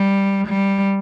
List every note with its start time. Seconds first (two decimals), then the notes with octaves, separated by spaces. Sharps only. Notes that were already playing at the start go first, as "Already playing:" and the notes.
Already playing: G3
0.48 G3